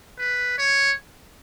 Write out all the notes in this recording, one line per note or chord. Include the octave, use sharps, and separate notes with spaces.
B4
C#5